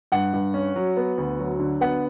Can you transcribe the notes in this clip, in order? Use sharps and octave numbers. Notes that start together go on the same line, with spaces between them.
G2 F#5
G2
C#4
F#3
B3
D2
F#3
D3
B3 F#5